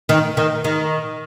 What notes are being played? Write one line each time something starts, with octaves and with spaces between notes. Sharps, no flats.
D#3
D#3
D#3